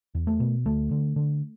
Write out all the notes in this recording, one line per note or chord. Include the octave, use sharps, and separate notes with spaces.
E2
A3
B2
D2 A3
D3
D3